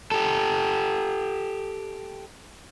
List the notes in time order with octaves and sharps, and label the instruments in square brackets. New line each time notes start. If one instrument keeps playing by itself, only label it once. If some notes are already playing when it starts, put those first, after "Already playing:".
[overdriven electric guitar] G4 A4